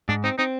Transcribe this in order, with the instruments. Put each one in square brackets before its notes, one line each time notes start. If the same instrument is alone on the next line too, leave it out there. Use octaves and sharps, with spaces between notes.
[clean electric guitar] G#2 [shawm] D4
[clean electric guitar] C4 [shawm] D#4
[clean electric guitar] C4 [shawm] D#4